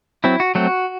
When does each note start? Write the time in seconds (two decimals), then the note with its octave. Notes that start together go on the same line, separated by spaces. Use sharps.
0.24 F#3 C4 E4
0.40 F#4
0.55 F#3 A3 C4 F#4